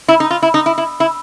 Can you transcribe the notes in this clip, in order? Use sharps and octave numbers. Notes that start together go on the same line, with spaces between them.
E4
D#4
F4
E4
D#4
E4
E4
E4